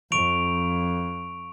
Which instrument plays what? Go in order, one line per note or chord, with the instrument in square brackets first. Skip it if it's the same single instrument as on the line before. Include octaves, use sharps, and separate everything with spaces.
[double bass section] F2 [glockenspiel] C#6 D7 F7